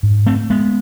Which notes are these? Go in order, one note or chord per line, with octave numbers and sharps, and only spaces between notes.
G#2
A3 C4
G#3 B3